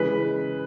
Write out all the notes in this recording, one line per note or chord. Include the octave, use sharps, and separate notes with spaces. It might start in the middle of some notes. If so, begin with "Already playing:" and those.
Already playing: C#3 E3 G#3 B4